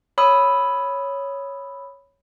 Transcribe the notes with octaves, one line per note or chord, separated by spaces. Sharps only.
C#5 B5 D#6 E6